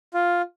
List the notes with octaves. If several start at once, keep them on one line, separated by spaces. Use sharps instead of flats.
F4